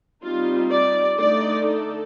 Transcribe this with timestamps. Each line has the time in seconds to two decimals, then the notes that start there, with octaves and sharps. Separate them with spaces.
0.23 G3 C4 D#4 F4
0.72 D5
1.19 D3 A3 D#4 D5
1.66 A4